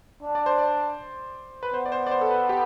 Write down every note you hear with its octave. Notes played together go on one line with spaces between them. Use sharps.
D4
D5
C5
D5
B4
B3 C5
D5
C5
D5
C5
A4
B4
G4